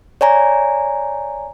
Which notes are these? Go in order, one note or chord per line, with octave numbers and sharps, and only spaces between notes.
C#5 D5 G#5 A#5